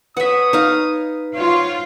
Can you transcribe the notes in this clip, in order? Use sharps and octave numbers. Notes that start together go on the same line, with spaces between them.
B4 C#5 E5 F#5 D#6 B6
D#4 F5
F4 F#4 C5 C#5